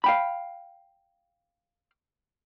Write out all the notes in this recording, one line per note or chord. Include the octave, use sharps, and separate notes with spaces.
F5 G5 B5